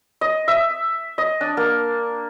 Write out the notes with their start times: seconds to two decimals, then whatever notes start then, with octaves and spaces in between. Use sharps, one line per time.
0.21 D#5
0.48 E5
1.18 D#5
1.41 D4
1.57 A#3